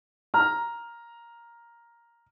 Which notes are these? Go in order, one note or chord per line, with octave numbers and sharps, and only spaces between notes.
A#5 F6